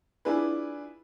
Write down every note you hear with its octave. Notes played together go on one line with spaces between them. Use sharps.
D4 E4 F4 G#4 B4